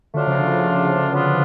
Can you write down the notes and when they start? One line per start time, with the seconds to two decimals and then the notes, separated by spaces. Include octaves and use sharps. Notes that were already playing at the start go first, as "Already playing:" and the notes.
0.14 D3 F#3 A3 D4 F4
0.26 C#3 F3
0.38 D3
0.51 C#3
0.63 D3
1.10 B2 F#3 B3 D4 F4